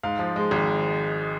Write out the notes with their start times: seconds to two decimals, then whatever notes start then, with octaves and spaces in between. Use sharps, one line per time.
0.03 G#2 F5
0.19 F3
0.36 G#3
0.51 G#1